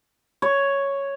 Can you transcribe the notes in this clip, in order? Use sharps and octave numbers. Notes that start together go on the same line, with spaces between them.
C#5